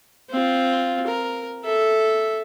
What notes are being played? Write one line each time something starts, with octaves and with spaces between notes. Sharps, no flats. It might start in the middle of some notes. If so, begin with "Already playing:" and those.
C4 F4
A#4
A4 E5